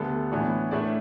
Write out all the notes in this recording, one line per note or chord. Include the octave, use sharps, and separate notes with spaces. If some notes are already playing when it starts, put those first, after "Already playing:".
Already playing: D2 D3 G3 B3 D4 A4
A2 E3 B3 D4
A2 A3 D4 D5